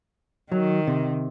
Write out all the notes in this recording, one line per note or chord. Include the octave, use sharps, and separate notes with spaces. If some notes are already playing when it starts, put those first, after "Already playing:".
D#3 F#3
C3